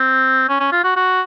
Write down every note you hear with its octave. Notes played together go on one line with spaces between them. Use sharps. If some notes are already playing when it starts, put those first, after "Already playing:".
Already playing: C4
C#4
C#4
F4
F#4
F#4